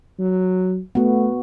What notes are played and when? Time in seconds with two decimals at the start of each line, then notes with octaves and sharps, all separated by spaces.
0.19 F#3
0.95 A3 B3 F#4